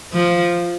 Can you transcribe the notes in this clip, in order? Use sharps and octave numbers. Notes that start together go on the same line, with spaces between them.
F3